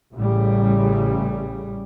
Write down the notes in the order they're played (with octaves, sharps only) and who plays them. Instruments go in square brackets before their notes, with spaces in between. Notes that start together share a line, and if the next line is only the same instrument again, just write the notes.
[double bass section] A1 A2 C#3 G3